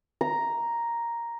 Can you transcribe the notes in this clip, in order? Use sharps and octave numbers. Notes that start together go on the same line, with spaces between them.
A#5